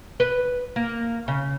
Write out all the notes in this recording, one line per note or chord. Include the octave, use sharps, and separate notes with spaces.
B4
A#3
C#3